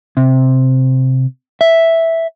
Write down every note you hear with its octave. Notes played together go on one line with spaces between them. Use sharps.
C3
E5